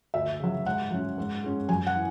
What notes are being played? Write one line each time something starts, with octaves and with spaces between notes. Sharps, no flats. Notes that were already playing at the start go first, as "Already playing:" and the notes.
D2 E5
C#3 F#3
G#2 F#5
F#3 C#4
G#2
G#3 C#4
F#2 G#5
F#5
E3